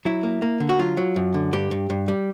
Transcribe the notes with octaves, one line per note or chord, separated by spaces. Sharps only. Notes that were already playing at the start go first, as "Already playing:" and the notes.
F#3 E4
A#3
A#3
D3
F#4
F#3 F4
F#3
F#2
D3
G2 G4
G2
G2
G3